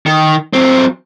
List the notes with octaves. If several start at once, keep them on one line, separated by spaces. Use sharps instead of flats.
D#3
F#3 C4